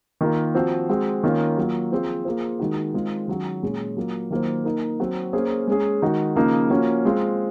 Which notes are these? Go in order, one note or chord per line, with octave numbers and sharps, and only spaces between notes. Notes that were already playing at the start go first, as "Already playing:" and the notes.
D#3 A#3 F4 A#4
F3 C4 F#4 C5
G#3 C4 F#4
D#3 A#3 C#4 F4
F#3 A#3 F4
F3 C4 F4 G#4 C5
A#3 F4 G#4 C5
D#3 G#3 D#4 F#4
D#3 G#3 C4 F4 G#4
D#3 F#3 C#4 F#4
A#2 G#3 C#4
F#3 A#3 F4
D#3 F#3 A#3 F4 C5
A#3 D#4 A#4
F#3 C4 F#4
A#3 C#4 G#4 C5
G#3 C#4 G#4
D#3 G#3 D#4 F#4
C#3 F3 A#3 D#4
F3 A#3 C#4 F#4
G#3 C4 F4 C5